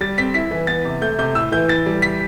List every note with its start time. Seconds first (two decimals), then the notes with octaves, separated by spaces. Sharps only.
0.01 G3 A6
0.18 C4 B6
0.34 E4 B6
0.51 E3
0.67 B3 A6
0.85 C3
1.01 A3 G6
1.18 C3 G6
1.35 A2 E6
1.52 E3 G6
1.68 E4 A6
1.86 G3
2.02 B6